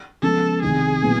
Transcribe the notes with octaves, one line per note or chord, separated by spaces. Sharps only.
C#3 F3 G#3 B3 A4
C2 C3 D#3 G#4
A#2 F#3 B3 E4